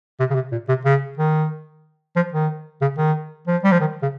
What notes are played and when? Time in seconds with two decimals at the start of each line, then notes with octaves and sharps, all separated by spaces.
0.19 C3
0.31 C#3
0.35 C3
0.52 A#2
0.69 C3
0.85 C#3
1.18 D#3
2.16 F3
2.33 D#3
2.82 C#3
2.98 D#3
3.47 F3
3.64 G3
3.72 F3
3.80 D#3
4.02 C#3